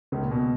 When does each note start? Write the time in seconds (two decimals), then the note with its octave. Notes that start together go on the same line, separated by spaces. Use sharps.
0.12 C#2 C#3
0.22 A#2
0.31 B2